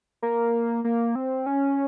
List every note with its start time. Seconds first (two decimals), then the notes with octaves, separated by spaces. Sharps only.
0.22 A#3
0.84 A#3
1.15 C4
1.46 C#4